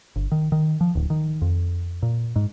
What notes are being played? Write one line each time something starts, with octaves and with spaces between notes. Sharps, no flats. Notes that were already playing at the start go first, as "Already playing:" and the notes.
G1
D#3
D#3
F3
D1
D#3
F2
A#2
G#2